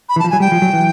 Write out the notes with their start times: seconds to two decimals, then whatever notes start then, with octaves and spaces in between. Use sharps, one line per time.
0.09 B5
0.16 E3
0.19 A5
0.24 F3
0.30 F#3 G#5
0.40 G3 G5
0.52 F3
0.62 F#3
0.73 E3